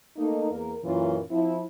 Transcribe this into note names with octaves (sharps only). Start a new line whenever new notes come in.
A3 A#3 D#4
E2 A#3 A#4
F#2 A#2 E3 C#4 F4
F3 C4 E4